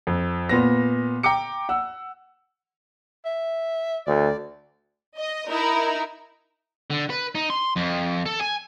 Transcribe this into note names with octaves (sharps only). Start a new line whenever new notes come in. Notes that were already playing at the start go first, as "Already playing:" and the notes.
F2
A#2 B3 A#6
G5 A#5 D6 C#7
F#5 E6
E5
D2 D5
D#5
D#4 E4 A#4
D3
B4
D#4
C6
F2
A4
G#5